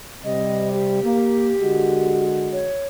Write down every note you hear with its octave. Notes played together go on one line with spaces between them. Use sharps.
C3 G3 D#5
G4
A#3
D3 G#3 F#4
C#5